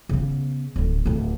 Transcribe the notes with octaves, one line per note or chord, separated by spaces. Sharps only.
C#3 B3
D1 D3
D1 D2